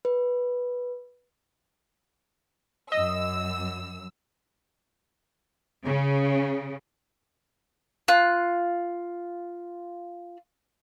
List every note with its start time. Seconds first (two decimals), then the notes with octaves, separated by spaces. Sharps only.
0.05 B4
2.92 F#2 D#5 E6
5.84 C#3
8.08 F4 F#6